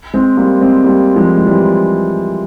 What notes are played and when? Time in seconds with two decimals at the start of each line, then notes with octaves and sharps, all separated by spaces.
0.14 G#3 C4
0.37 G3 A#3
0.61 G#3 C4
0.84 G3 A#3
1.16 F3 G#3
1.37 G#3
1.47 E3 G3